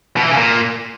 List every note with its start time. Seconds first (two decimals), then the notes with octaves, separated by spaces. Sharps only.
0.17 B2
0.23 E3
0.30 C#3
0.37 A#2